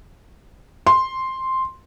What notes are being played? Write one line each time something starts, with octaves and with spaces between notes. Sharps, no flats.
C6